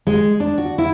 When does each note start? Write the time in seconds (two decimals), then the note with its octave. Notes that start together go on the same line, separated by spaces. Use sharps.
0.07 G#3
0.40 D4
0.58 F#4
0.78 E4